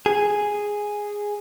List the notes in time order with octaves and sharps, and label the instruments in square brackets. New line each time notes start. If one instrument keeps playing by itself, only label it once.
[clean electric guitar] G#4